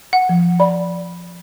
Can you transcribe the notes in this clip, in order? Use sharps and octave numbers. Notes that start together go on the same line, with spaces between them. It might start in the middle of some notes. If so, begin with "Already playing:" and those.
F#5
F3
D5 B5